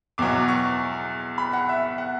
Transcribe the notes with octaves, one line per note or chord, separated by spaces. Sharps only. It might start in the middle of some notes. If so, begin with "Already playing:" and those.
E2 B2 F#3 D6
C#6
B5
F#5
E5
F#5